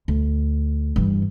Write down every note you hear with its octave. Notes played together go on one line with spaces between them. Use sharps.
D2
G2 E3